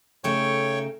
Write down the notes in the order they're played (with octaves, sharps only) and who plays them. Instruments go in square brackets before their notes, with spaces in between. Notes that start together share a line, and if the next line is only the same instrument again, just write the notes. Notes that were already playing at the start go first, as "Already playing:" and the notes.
[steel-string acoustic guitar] C#3 A3 D#4 [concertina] C#5 G5 C#6